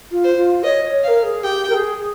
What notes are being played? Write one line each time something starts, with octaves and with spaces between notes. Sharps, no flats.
F4
C5
F4
C#5 D#5
C#5
A#4 C#5 F5
G#4
G4 G5
A#4
G#4
G#4